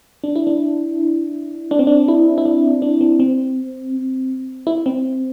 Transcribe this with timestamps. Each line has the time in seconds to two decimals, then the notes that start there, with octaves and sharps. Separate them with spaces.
0.24 D4
0.36 E4
0.47 D4
1.71 D4
1.79 C4
1.87 D4
2.08 E4
2.38 E4
2.45 D4
2.82 D4
3.01 C4
3.20 C4
4.67 E4
4.86 C4